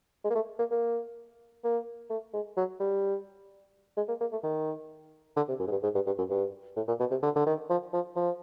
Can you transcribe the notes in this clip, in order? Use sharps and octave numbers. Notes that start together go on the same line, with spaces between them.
G#3
A#3
A3
A#3
A#3
A#3
A3
G#3
F#3
G3
G#3
A#3
A#3
A3
D#3
D3
C3
F#2
G#2
G2
G#2
G2
G2
F#2
G2
A2
A#2
B2
C3
D3
D3
D#3
F3
F3
F3